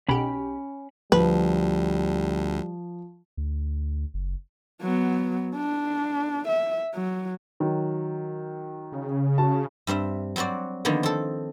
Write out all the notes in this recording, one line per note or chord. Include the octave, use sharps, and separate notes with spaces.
B1 B2 C#4 G4 B5
D2 F3 G3 B4
D2
F#1
F#3 B3
D4
E5
F#3
D#3 F#3
C#3
F#4 A5
G2 G3 C4 E5
F#3 G3 C4 F#4 D5
D3 D#3 F3 A#3 B3
C4 A4